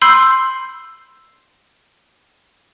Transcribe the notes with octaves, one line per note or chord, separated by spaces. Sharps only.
B5 C6 E6 G6 C7